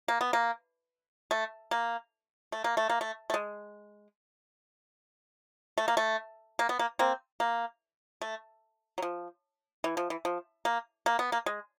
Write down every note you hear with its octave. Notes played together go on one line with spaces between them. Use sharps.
A#3
B3
A#3
A3
A#3
A3
A#3
A3
A#3
A3
A3
G#3
A3
A#3
A3
A#3
B3
A#3
A#3 C4
A#3
A3
F#3
F3
E3
F3
E3
F3
A#3
A#3
B3
A#3
G#3